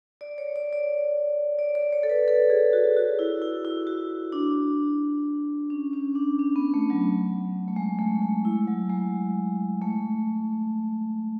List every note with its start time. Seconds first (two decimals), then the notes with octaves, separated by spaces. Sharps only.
0.21 D5
0.38 C#5
0.56 D5
0.73 D5
1.59 D5
1.75 D5
1.92 C#5
2.03 A4
2.10 B4
2.28 A4
2.50 G#4
2.73 F#4
2.96 F#4
3.19 E4
3.42 E4
3.65 E4
3.87 F#4
4.32 D4
5.70 C#4
5.93 C#4
6.15 D4
6.39 C#4
6.56 B3
6.74 A3
6.90 F#3
7.68 A3
7.76 G#3
7.99 A3
8.22 A3
8.45 E4
8.68 F#3
8.90 G#3
9.82 A3